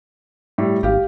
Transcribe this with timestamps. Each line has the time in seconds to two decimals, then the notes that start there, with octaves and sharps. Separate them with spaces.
0.58 A2 G3
0.83 G#1 G4 F5